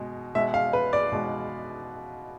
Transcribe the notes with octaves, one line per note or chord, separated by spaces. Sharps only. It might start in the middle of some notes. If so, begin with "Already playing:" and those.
Already playing: B2 G#3
B2 G#3 E5
F5
B4
D5
B2 G#3